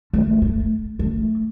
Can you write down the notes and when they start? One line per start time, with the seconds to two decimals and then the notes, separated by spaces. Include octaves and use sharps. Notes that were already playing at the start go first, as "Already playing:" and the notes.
0.14 A3
0.42 A3
0.99 A3